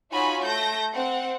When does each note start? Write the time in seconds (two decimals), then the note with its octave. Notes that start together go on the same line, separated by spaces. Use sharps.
0.13 D#4 F4 F#4 C#5 G#5 B5
0.43 A3 G6 A#6
0.94 C4 F#5